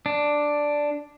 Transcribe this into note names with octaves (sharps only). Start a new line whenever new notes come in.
D4